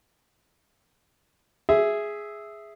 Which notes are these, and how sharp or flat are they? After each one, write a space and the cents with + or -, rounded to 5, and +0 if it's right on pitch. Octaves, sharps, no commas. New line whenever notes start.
G#4 +0 E5 +0